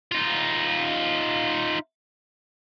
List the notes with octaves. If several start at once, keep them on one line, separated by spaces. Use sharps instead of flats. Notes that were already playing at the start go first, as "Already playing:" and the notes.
D#4 F4